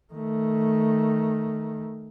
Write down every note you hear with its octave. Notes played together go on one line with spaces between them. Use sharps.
D#3 A3